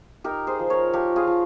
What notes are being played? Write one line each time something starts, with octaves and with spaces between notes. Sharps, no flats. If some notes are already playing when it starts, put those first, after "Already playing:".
D#4 G4 A#4
G#4 C5
F3
A#4 C#5
F3 G4 A#4
F4 G#4
F3